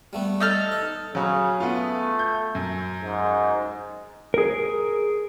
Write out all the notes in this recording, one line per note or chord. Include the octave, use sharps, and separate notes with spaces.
G3 A3 B3
D#4 A4 F6
B4
C#3 F#3 C#4
A3 B3 F4
G6
F#2
G#2
G#4 A#4